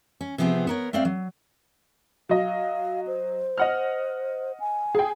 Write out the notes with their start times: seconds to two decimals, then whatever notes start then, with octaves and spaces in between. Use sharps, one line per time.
0.21 C#4
0.38 C3 F3 B3 C4 G#4
0.67 B3 A#4 C#5
0.93 A3 B3 C4 D5 F5
1.05 F#3
2.29 F#3 D#5 F5
3.07 C5
3.58 D#5 F#5 F6
4.60 G#5
4.95 G#4 G5